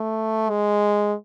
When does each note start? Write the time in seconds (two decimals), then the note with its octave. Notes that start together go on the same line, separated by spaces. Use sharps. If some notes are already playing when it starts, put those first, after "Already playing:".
Already playing: A3
0.50 G#3